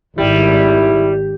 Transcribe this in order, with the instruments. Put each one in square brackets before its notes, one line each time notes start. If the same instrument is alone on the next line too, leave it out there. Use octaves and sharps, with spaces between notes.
[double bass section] G#1 [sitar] G3 [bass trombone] E4